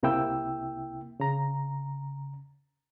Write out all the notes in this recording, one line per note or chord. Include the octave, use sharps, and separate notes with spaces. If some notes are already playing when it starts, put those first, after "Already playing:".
C2 C3 A#3 E4 G5 E6
C#3 A#5